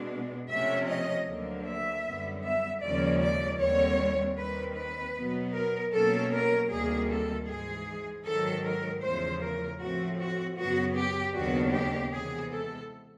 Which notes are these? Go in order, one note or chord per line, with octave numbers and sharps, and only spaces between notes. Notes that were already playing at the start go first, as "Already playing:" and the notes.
Already playing: B2 G#3 B3 D4
C3 F3 A3 C#4 E5
D#5
D2 D3 F#3 A#3
E5
F#2 D3 G3 B3
E5
D#2 C#3 F3 G#3 C#4 D5
D5
D#2 D3 G3 C4 C#5
D#2 D#3 G3 C4 B4
B4
B2 F#3 B3
A#4
B2 F#3 A#3 C#4 A4
A#4
D2 C3 D#3 G3 A#3 G#4
A4
G#2 E3 G#3 G#4
G#2 D#3 F#3 A4
A#4
E2 C#3 F3 A3 C5
A#4
A2 F3 A3 C4 F#4
F#4
F#2 C#3 F#3 B3 F#4
G4
D#2 C#3 F#3 B3 D4 F#4
G4
C3 E3 G#3 B3 G#4
A4